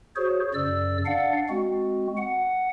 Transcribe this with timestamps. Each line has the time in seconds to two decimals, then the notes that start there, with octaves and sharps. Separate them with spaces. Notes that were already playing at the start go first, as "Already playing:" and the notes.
0.16 F#4 G#4 C5 C#5
0.54 F#2 C#3 D5 E6
1.06 D4 D5 F5 F#5
1.49 G#3 C4 F#4
2.17 F#5